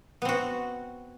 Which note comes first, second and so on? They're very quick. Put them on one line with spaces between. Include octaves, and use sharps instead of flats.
B3 C4 F#4